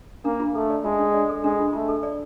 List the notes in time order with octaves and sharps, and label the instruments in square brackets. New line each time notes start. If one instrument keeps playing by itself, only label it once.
[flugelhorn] A#3 [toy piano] D4
[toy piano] F4
[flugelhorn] A3 [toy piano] A4
[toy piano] D5
[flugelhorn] G#3 [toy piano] F4
[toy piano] D4
D5
A4
[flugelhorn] G#3 [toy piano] D4
[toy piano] F4
[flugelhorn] A3 [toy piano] F4
[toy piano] A4
D5